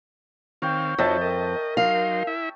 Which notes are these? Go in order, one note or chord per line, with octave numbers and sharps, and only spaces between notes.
D#3 C4 C#5 F5 G5
F2 F3 D#4 F#4 C#5 E5 G5 A5
A#4 D#5
F#3 D#4 F5 C6
E4 E5